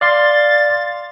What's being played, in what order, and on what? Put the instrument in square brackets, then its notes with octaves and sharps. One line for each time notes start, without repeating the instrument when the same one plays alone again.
[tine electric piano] D5 F5 C6 [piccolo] A6